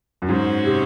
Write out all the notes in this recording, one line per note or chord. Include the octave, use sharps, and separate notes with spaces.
F#2
G#2 G#3 C#4 F#4 C5
C3